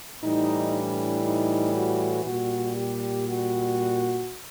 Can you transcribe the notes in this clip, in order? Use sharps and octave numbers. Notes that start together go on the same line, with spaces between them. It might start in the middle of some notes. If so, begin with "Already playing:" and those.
A2 E3 G3 D#4
D4
D#4
F#4
A#2 G3 F#4
G4
F#4